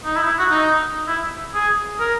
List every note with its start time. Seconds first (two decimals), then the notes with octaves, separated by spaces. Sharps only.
0.05 D#4
0.16 E4
0.27 E4
0.39 F#4
0.51 D#4
1.08 E4
1.54 G#4
2.00 A#4